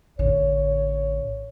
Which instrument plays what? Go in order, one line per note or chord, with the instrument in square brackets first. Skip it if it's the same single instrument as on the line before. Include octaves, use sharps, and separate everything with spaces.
[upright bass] A1 D3 [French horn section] C#5